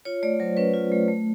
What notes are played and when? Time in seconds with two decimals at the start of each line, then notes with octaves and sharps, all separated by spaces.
0.05 F4 C#5
0.23 A3 D5
0.40 F#3 C5
0.57 C#4 B4
0.74 F4
0.92 A3
1.08 A3